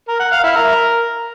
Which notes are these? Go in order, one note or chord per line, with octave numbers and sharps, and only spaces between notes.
A#4
F#5
F5
E4
A#4